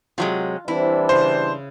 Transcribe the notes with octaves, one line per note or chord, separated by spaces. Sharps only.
C3 F#3 G#3 F4
E3 G3 C4 D4 E4
C#3 C5